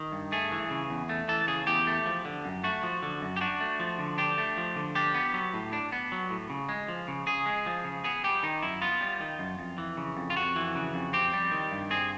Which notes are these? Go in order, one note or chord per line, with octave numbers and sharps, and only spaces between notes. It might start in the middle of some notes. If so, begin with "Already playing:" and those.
Already playing: D#3
G2
A3 G#4
E3
C#3
E2
A3
E3 A4
C#3 G#4
E2 G4
A3
F3
D3
F#2
A3 F#4
F3
D3
F#2
G4
D4 F#4
A3
F3
D3
D4 G4
A3
F3
D3
D4 G4
B3
F#3
A2
D4
B3
F#3
A2
C#3
G#3
F3
C#3
C#3 G#4
G#3
F3
C#3
B3 G#4
G3 G4
D#3 D#4
F#2 E4
B3 F4
G3
D#3
F#2
F2
E3
C#3
F2
F4
F2 F#4
E3
C#3
F2
C4 G4
G3
D#3
G2
C4 G#4